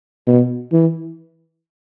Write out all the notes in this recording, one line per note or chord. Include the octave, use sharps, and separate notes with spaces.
B2
E3